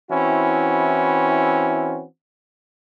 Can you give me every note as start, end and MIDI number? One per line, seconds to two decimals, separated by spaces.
0.10 2.03 52
0.10 2.03 60
0.10 2.03 61
0.10 2.03 64
0.10 2.03 66